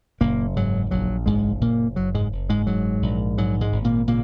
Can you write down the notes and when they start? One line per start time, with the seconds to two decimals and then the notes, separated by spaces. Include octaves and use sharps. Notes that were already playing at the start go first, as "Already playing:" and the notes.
0.21 F#1 A#2 A#3
0.56 G#2 F#3
0.91 A#1 F#3
1.26 F#1 G#2 G#3
1.61 F#1 A#2 A#3
1.96 F#1 F#3
2.15 G#2 G#3
2.32 F#1
2.49 G#2 G#3
2.67 G#2 F#3
3.02 A#1
3.38 G#2 F#3
3.61 G#2 G#3
3.72 G#1
3.84 A#2 A#3
4.08 A#2 C#3 A#3